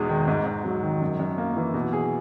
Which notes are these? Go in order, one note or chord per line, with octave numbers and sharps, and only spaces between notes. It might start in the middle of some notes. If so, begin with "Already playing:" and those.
Already playing: E2 B2 G#3 D#4
D#3
G#2
G#2
F#3
D#3
F#2
F#2
A#3
E3
B2
G#4